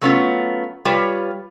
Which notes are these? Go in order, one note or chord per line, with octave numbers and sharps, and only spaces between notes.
F#3 A3 B3 C#4 E4 F4
G3 F4 B4 C#5